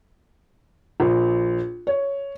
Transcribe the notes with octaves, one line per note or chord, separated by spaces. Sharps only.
A#1
C#5